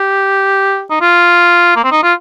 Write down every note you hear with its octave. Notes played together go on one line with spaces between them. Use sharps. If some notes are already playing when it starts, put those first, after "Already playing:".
Already playing: G4
D#4
F4
A#3
C4
D#4
F4